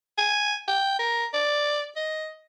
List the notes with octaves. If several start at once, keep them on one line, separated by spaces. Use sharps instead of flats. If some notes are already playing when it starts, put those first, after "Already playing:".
G#5
G5
A#4
D5
D#5